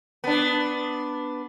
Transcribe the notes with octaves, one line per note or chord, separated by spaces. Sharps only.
B3 D4